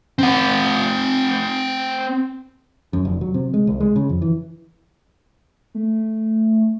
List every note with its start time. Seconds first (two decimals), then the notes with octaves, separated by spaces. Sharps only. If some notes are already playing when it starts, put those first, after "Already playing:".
0.19 C4 F#5
2.93 F#2
3.05 F1
3.21 F#3
3.34 C3
3.54 G#3
3.67 C2
3.80 G#3
3.96 C#3
4.09 F2
4.22 E3
5.75 A3